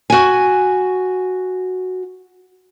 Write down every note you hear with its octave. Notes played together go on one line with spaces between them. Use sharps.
F#4 G#5